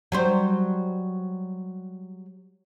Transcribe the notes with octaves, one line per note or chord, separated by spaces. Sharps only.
F#3 G3 C5